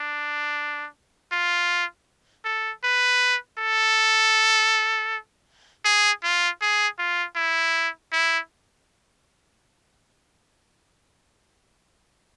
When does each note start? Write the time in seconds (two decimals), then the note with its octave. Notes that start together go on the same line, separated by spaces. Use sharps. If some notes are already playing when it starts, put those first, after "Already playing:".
Already playing: D4
1.32 F4
2.45 A4
2.84 B4
3.58 A4
5.85 G#4
6.23 F4
6.61 G#4
6.98 F4
7.36 E4
8.12 E4